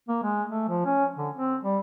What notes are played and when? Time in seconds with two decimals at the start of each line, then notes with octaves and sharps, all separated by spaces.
0.09 A#3
0.23 G#3
0.50 A3
0.69 F3
0.85 C#4
1.17 D3
1.36 C4
1.63 G3